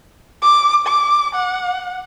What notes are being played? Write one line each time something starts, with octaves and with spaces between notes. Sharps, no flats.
D6
D6
F#5